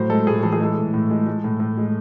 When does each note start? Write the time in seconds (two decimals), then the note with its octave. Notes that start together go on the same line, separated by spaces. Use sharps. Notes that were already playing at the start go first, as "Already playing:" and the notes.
Already playing: A2 F#3 C5
0.10 G#3 A4
0.27 A2 G#4
0.43 E3 A4
0.53 G#4
0.60 G#3 A4
0.77 A2
0.94 A2
1.11 G#3
1.26 G#3
1.44 A2
1.60 A2
1.78 G#3